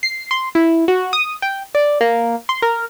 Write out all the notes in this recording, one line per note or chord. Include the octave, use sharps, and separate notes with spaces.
C7
C6
E4
F#4
D#6
G5
D5
A#3
C6
A#4